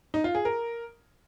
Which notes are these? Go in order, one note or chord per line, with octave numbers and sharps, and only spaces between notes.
D#4
F4
G#4
A#4